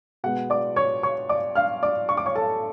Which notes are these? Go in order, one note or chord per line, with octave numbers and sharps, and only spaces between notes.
B2 G#3 B3 F#5
D5 D6
C#5 C#6
C#5 C#6
D5 D6
F5 F6
D5 D6
C#6
D6
C#5 C#6
A4 A5